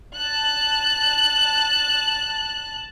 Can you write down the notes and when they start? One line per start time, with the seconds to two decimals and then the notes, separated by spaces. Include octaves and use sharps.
0.15 A5 F#6